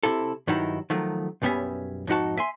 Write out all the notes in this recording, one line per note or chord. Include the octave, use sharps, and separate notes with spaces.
C3 E4 A4
G2 D#3 F#3 D#4 E4
D#3 F3 F#3 A3
B1 F#2 G3 B3 C#4 E5
F2 G#2 D#4 F#4 A5
E5 G#5 C6